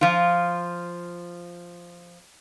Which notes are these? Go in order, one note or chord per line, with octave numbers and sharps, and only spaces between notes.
F3 F4